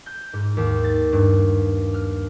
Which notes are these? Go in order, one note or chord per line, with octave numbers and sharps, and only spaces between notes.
G6
G#2
D#2
A6
G2
F6